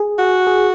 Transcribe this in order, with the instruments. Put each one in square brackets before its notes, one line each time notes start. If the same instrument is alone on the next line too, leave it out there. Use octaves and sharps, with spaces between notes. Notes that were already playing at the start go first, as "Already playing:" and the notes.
Already playing: [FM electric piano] G#4
[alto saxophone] F#4
[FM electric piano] G#4